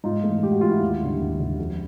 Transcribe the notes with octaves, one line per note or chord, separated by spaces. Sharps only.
G#2 D#4 F4
E3 A3
G#2 G4
F#4
E3 A3 F4
E4 F#4
D#2
D3 G3
D#2
D3 G3
F2